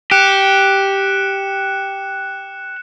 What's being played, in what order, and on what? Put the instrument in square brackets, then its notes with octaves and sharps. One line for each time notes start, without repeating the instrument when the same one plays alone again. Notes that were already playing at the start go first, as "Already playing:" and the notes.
[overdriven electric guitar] G4 [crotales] F#6 C#7 E7